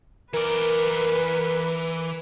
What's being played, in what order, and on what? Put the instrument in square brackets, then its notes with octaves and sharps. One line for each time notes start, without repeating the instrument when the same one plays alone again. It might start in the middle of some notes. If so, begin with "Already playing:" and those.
[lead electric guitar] E3 D5 [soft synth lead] A#4 [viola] B4